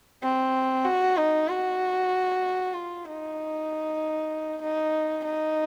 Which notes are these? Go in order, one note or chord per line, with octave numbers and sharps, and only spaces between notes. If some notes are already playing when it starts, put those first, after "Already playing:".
C4
F#4
D#4
F#4
F4
D#4
D#4
D#4